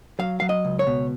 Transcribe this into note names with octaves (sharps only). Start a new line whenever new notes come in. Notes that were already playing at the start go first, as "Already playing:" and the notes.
F#3 F5
F#3 F5
D#5
C#2
C#5
B2